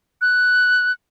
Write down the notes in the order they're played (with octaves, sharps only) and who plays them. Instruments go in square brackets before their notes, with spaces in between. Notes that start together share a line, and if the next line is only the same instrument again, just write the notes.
[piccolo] F#6